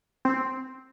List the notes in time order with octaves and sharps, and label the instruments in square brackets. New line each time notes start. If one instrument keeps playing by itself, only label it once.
[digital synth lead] C4